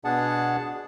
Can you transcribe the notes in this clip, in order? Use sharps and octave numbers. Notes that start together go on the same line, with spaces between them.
B2 B3 D4 G#4 F#5 A5